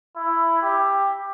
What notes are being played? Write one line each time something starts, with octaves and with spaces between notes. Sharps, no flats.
E4
G4